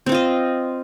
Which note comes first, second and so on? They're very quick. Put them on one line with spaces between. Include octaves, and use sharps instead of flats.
C4 C5 F4 D#5